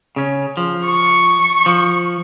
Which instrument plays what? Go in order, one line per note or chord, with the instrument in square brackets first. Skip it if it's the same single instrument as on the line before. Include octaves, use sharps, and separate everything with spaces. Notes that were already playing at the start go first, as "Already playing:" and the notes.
[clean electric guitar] C#3 C#4
F3
[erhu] C#6
[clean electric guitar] F3